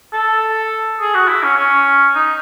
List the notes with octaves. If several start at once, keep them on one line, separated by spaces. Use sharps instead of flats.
A4
G#4
F#4
E4
C#4
C#4
D#4